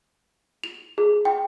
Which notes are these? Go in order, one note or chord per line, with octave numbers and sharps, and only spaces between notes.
F7
G#4
G5